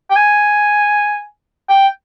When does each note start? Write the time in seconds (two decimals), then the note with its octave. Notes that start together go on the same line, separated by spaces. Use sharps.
0.11 G5
0.16 G#5
1.70 G5